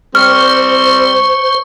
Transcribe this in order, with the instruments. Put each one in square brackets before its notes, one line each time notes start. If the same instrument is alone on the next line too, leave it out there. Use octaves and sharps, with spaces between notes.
[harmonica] G3 C4 [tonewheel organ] C5 [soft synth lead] C#6 [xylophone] F6